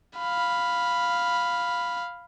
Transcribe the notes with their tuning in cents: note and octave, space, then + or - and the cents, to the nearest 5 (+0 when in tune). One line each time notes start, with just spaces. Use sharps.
F5 +0 B5 +0